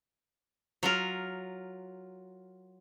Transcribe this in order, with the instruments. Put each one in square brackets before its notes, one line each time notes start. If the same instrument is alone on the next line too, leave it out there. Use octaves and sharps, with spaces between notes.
[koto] F#3 F4 A#4